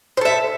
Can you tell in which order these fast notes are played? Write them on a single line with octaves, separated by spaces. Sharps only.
C5 A4 E5